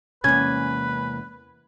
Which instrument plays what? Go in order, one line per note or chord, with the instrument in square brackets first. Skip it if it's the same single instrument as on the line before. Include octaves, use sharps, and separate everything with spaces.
[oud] E2 C#4 [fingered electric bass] C3 G#3 A#3 [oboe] B4 [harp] G#6